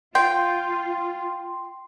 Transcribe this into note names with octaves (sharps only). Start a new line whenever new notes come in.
F4 G5 C6